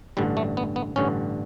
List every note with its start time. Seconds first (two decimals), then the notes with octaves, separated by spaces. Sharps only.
0.17 A1 G2 D3 G3
0.37 A3
0.57 B3
0.76 B3
0.96 A1 G2 D3 C#4